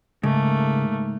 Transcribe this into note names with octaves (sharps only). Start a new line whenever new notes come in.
G#2 C#3 A3 A#3